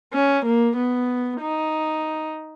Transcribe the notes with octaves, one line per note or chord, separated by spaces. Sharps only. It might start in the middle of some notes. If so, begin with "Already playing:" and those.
C#4
A#3
B3
D#4